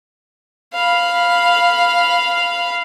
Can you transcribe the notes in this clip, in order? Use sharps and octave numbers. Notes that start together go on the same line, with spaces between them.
F5 B5